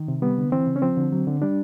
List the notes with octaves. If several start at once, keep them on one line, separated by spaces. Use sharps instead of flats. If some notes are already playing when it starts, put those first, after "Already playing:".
Already playing: D#3
C3
G3 B3
D3
E3 C4
C#3
C#4
F3 C4
D3
F#3
D3
G3 D4